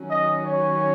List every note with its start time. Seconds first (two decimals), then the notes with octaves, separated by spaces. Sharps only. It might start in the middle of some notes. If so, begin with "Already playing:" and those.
Already playing: D#3 F#3 C#4
0.10 D#5
0.45 C#5